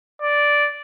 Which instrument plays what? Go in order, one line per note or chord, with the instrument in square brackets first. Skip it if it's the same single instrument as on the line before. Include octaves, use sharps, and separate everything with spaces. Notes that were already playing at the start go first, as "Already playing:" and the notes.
[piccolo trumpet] D5